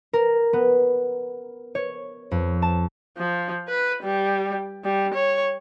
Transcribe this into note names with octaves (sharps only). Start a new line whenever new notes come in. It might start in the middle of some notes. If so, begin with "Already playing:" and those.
A#4
B3
C#5
F2
A5
F3
B4
G3
G3
C#5